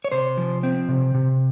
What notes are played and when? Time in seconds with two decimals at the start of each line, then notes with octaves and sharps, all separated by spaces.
0.05 C#5
0.12 C3 C5
0.37 F3
0.63 C4
0.89 C3
1.14 C3